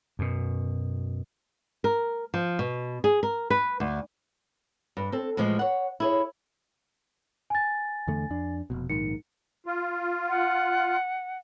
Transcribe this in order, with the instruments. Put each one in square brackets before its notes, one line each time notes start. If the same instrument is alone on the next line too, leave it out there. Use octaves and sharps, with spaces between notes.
[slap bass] F#2 B2
[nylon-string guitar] A#4
F3
B2
G#4
A#4
B4
D2
G2
C4 A4
A2 E3 F3 G#3
C#5 F#5
E4 G#4 C#5
[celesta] G#5 A6
[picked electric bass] E2 D3 A3
F2 D4
F1 C#2 B2
[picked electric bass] A#1 G#2 D#3 [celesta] C#7
[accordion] F4
[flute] F#5